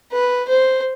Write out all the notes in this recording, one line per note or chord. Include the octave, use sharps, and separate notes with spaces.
B4
C5